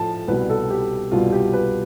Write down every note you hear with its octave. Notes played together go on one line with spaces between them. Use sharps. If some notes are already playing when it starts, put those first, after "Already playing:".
Already playing: A2 F3 A5
C2 B2 G3 B4
A4
G4
C2 B2 G3 F4
G4
B4